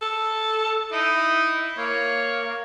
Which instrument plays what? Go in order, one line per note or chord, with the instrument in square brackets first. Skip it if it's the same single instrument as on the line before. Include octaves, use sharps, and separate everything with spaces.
[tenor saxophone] A4
[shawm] D#4 [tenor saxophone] E4
[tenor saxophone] A#3 [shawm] C#5